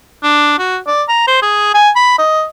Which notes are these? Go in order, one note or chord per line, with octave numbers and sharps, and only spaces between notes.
D4
F#4
D5
A#5
C5
G#4
G#5
B5
D#5